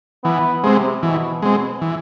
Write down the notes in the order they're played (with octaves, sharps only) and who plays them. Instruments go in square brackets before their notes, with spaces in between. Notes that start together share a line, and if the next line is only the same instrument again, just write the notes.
[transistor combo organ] E3 [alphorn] B3
[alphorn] C3 [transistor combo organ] G#3 C4
[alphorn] B2 [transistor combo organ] E3
[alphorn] B2 [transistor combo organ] G#3 C4
[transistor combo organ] E3